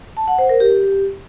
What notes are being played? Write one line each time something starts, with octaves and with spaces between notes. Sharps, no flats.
A5
F#5
C5
A#4
G4